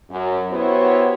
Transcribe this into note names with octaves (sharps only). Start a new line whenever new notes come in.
F#2
B3 E4 F#4 G4 C5 C#5